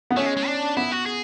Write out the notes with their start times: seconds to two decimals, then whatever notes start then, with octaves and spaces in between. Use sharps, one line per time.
0.10 B3
0.17 A3 C#4
0.26 G#3
0.37 G#3
0.47 D4
0.77 B3 E4
0.92 F#4
1.06 G#4